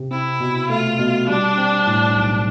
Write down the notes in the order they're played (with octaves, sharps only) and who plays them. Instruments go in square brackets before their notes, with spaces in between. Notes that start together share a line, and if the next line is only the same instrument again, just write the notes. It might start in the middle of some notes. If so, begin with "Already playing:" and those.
Already playing: [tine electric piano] C3
[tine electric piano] C4 [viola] E4
[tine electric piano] B2
[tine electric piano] A3 [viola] F4
[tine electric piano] B2
[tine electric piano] G3 [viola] D4
[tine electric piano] C4
A2
B1